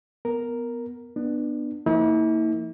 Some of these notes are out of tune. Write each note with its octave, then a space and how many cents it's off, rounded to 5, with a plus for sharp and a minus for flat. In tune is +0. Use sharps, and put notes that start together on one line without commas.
B3 +0 A#4 +0
B3 -15 D4 +25
F3 -30 A#3 -25 E4 -45